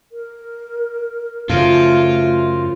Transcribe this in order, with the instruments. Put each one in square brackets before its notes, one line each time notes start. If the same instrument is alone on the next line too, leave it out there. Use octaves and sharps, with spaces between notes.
[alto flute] A#4
[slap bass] F#2 C#3 [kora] F3 [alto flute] A3 [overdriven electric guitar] F4